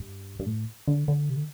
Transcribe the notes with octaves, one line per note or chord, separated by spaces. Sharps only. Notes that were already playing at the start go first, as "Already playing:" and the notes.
Already playing: G2
G2
A2
D3
D3
C3
D3